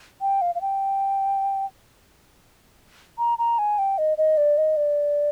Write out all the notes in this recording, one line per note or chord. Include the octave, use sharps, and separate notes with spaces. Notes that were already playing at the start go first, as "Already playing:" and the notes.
G5
F5
F5
G5
A#5
A#5
G#5
G5
D#5
D#5
D5
D#5
D5